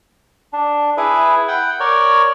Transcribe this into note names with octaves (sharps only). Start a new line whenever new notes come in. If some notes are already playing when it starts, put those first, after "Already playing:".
D4
E4 G#4 B4
F#5 G5
A#4 C#5 D5